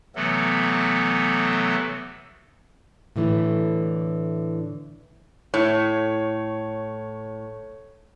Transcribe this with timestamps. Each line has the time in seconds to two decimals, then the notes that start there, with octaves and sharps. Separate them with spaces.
0.16 C3 E3 F#3 A3 B3 A4
3.16 A2 D3 E3 G#3 A3
5.54 A2 C#5